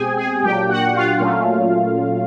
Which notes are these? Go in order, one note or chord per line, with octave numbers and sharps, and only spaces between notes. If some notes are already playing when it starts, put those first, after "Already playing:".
Already playing: B2 G#3 C4 G4 G#4 G5 G#5
G#4 G#5
A#2 F#3 A#3 D4 G4 G5
F#4 F#5
F4 F5
A#2 F#3 A3 C#4